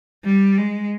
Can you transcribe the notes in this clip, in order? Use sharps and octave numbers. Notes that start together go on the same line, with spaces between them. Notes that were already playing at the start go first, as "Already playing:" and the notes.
G3
G#3